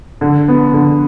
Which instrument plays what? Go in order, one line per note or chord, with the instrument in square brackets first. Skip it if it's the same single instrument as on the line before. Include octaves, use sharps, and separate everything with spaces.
[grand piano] D3
B3
D3